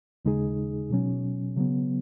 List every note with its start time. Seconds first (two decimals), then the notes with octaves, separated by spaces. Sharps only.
0.25 D#2 C#3 G#3 D#4 G#4
0.90 B2 F#3 C#4
1.56 C#3 F#3 B3